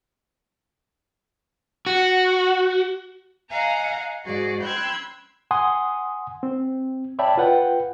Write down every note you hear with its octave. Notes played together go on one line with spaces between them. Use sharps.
F#4 F#5
D#5 F5 F#5 G#5 A#5
G#2 F#4 G#4 D5
G5 B5 C6 E6 F#6 G#6
F#5 G#5 C6 D#6
C4
C#5 D5 E5 G5 A5 B5
F4 B4 F#5 G5